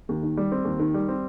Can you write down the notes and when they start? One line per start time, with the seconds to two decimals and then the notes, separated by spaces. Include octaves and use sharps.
0.09 D#2
0.23 D#3
0.37 G3
0.52 C4
0.65 D#2
0.79 D#3
0.94 G3
1.08 C4